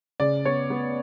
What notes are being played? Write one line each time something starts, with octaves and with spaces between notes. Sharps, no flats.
C#3 D5
B3 C#5
B3